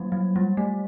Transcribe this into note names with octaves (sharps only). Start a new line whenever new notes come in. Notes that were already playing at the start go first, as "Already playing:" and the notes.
Already playing: F#3 G3 A#3
F#3
G3
A3